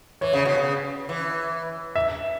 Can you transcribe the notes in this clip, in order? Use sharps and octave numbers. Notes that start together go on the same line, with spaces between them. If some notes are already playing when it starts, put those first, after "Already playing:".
E3 C#5
C#3
B2
C#3
E3
E5